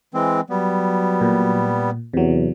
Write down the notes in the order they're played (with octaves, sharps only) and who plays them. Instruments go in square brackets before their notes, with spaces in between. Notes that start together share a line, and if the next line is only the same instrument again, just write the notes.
[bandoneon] E3 G#3 C4
[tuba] F#3 [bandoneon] G3 B3
[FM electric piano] A#2
[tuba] E2 [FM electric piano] C3 F#3